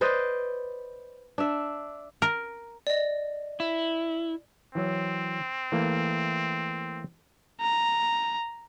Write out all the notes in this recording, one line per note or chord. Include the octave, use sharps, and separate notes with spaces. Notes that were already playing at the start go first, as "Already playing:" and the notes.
B4 C5 D5 D#5
D4 E5
A#4
D5 D#5
E4
E3 F#3 C4
E3 A3 A#3
A#5